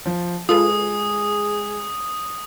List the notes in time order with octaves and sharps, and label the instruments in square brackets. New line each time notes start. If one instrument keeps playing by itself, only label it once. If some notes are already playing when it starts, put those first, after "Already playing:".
[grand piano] F3
[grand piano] G#3 [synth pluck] F4 A4 B4 [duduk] G#4 [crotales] D#6